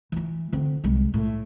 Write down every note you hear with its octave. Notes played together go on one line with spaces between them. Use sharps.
E3 F4
D3 C4
C2 G#3
A2